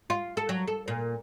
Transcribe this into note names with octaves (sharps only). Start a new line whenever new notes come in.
F4
A4
F#3
A4
A#2